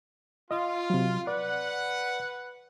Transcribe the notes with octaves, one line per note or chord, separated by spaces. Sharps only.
F4 D#5
C3 F#3
B4 D5 F#5